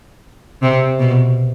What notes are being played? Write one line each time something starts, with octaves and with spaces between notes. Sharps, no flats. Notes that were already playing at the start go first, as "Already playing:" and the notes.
C3
B2